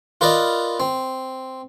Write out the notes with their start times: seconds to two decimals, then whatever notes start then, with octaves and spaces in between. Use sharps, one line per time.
0.21 F4 A#4 B4 D5 D#5
0.80 C4